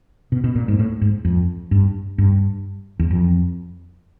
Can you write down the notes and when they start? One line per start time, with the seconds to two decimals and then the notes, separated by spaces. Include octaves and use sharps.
0.32 B2
0.44 B2
0.56 A#2
0.68 G#2
0.79 A2
1.01 G#2
1.25 F2
1.71 G2
2.18 G2
2.99 E2
3.11 F2